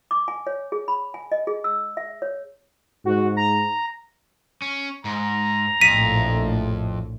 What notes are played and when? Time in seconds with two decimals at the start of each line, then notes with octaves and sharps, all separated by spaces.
0.11 D6
0.28 G#5
0.47 C#5
0.72 G#4
0.88 B5
1.14 G#5
1.32 D#5
1.47 G#4
1.64 E6
1.97 E5
2.22 C#5
3.05 G#2 F#4
3.37 A#5
4.62 C#4
5.05 G#2 A#5
5.81 A#1 F2 A2 B6 D#7